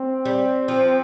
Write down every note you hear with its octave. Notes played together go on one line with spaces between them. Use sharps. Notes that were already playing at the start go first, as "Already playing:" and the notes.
Already playing: C4
G3
F3